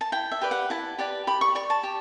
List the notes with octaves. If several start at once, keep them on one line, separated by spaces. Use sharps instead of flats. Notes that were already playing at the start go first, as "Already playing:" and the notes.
A5
E4 G5
E5
G4 B4 D5
F#5
E4 A5
G4 B4 D5
G4 B5
C#6
D5 C#6
A5
G4